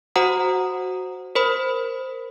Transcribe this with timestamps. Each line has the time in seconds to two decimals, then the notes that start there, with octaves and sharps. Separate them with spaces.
0.16 F#4 C5 F#5 A#5 D#6
1.35 A#4 C5 B5